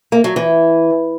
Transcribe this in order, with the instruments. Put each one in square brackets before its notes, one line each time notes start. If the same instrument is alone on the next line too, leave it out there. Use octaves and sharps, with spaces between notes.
[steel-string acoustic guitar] A#3
F#3
E3